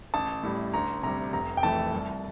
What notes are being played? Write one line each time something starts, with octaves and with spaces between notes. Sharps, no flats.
A1 A5
A2 G3
D2 A#5
C3 G3 A#5
F1 A#5
G5
F2 E3 A3 A5
C2